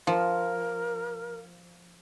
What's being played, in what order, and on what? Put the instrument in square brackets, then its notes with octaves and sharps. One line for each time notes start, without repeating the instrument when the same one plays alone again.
[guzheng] F3 [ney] A#4